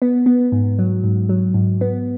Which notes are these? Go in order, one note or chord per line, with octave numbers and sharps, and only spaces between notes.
B3
B3
G#2
F#3
G#2
F#3
G#2
B3